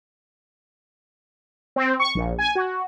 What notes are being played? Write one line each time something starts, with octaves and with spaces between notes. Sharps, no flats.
C4
C#6
A#1
G#5
F#4